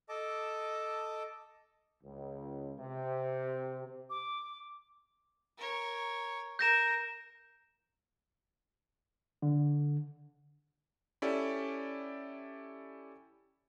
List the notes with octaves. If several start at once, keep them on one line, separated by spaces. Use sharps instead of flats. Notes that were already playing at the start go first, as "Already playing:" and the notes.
A4 D#5 A5 D6
C#2
C3
D6
A#4 C#5
A#4 G6 A#6 E7
D3
C#4 E4 G4 A4 D5